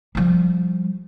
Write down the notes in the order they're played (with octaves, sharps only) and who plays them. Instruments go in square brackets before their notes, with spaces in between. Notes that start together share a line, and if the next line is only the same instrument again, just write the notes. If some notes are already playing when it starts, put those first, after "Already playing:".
[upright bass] F3 G3